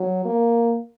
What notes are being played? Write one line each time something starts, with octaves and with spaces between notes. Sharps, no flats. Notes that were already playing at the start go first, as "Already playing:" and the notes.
Already playing: F#3
A#3